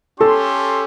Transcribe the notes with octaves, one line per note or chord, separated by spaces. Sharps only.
C#4 G4 A4 C6